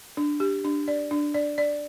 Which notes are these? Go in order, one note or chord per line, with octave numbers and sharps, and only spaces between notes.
D4
G4
D4
D5
D4
D5
D5